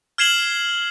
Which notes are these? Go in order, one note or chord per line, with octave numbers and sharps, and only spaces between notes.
F6 G#6 C7 E7 F#7 G7